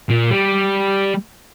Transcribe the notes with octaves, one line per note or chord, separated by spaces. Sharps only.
A#2
G3